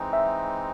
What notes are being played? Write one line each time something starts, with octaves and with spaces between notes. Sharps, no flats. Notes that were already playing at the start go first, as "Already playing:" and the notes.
Already playing: E3 G#3 C4 D#4
E5